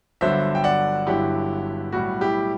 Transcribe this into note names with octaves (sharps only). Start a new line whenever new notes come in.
G1 G2 D3 F#3 C5 E5
G5
D5 F#5
G1 G2 D3 F#3 E4 G4
B1 A2 G3 F#4
E4 G4